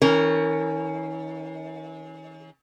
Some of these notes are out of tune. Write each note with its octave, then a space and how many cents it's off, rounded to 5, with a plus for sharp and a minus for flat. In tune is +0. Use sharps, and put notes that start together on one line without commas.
E3 -45 C#4 +0 A#4 -25